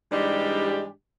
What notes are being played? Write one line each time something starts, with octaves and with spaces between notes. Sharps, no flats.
G#2 E3 G3 G#3 D4 G4